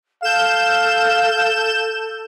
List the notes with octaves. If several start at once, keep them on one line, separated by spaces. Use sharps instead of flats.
A4 F5 G6 E7